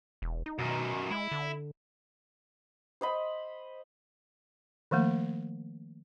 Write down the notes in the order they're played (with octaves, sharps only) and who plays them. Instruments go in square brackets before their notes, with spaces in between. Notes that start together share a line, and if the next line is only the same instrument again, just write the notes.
[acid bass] E1
D#4
[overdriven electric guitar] F#2 D#3 [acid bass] B2
[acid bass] G#3 [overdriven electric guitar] E4
[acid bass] D3
[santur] C5 D#5 B5
[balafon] D#3 F3 A3 A#3